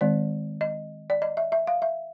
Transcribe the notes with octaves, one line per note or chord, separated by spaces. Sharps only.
D#3 G#3 C4 D5
D#5
D5
D#5
E5
E5
F5
E5